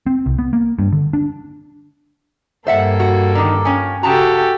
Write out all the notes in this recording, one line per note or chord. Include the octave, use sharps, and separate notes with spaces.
C4
C2
B3
A#3
G2
D3
D4
G2 A#3 A4 C5 E5 F#5
F#4
D3 D#3 A#5 D6
F3 C#4 G5 G#5
C#3 F#4 G4 A4 A5 A#5